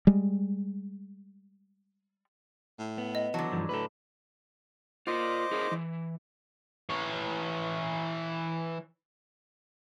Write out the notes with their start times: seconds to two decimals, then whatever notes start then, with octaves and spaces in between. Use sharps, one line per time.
0.07 G3 G#3
2.79 A2
2.98 B3
3.15 D#5
3.34 D3 E3 F#3 B3 A5
3.52 G2 E3 F3
3.69 A2 A4 B4
5.07 F4 A#4 C5 D#5 D6
5.51 E4 G#4 A#4
5.71 E3
6.89 E3 C#5